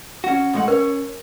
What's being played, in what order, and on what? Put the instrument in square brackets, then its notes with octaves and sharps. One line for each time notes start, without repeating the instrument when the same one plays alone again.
[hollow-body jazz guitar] C#4 F#4
A2 G#3 F#5
[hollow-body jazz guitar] C#4 C#5 [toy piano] A#4